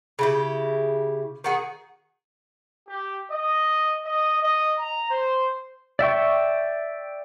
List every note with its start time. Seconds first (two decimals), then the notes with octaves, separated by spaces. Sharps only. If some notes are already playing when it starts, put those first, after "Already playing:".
0.19 C#3 E4 G4
1.44 D#3 F#4 G#4
2.88 G4
3.32 D#5
4.05 D#5
4.43 D#5
4.79 A#5
5.11 C5
5.99 D5 E5 G5 C#6